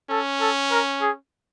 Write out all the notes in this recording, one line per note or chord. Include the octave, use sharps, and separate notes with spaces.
C#4 A4
A4
A#4
G#4